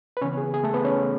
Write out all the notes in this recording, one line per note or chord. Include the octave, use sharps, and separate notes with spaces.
B4
C#3 E3 B3 C#4 C#5
G#4
G#4
A3 A4
B3 B4
C#4 C#5